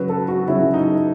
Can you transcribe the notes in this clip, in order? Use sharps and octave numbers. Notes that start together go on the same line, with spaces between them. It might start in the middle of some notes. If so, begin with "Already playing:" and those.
Already playing: C#3 F#3 B4
A4
F#4
C#3 F#3 E4
D#4